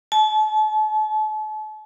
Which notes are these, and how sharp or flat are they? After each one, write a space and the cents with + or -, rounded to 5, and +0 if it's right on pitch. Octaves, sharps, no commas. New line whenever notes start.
A5 -40